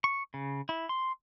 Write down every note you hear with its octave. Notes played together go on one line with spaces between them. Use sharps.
C#6
C#3
E4
C6